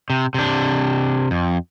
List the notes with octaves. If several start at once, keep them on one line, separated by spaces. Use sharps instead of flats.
C3
C3 D4
F2